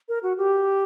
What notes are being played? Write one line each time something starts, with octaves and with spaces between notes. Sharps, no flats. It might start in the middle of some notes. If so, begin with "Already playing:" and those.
A#4
F#4
G4